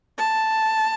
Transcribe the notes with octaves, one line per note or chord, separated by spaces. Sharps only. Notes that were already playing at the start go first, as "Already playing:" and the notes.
A5